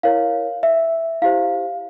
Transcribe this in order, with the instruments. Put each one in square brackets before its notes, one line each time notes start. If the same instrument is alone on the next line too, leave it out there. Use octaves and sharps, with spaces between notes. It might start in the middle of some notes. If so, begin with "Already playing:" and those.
[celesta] E4 A#4 C#5 F5
E5
E4 G4 C5 F5